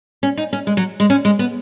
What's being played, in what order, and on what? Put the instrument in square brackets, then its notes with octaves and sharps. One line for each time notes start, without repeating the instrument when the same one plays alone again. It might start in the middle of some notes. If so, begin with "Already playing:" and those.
[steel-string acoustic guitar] C#4
D#4
C#4
G#3
F#3
G#3
C#4
G#3
B3